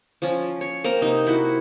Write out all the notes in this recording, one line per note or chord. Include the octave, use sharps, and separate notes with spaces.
F3 C#4
C#5
A#3 C4 A#4 A#5
C3 D#4
E4 F#4